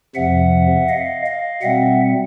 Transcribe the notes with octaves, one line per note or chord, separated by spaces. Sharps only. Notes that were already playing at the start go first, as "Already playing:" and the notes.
F2 C3 F3 E5 F#5
D#5 F5
D#5 F5
B2 G3 C4 E5 F#5